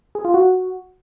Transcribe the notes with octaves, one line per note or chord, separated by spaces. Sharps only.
G#4
F4
F#4